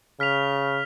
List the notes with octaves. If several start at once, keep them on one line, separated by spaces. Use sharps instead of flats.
C#3 F6 B6 F7